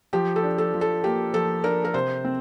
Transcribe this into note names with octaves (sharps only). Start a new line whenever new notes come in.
F3 G4
A4
D4
A4
F3
A4
A#3 G4
F3 A4
D4 A#4
A#4
C3 C5
C4